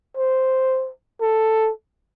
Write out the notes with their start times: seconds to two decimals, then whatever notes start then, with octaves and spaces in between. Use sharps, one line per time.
0.17 C5
1.21 A4